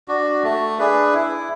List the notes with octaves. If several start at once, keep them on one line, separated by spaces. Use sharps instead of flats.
D4 F#4
A3
D4 G#4 B4
E4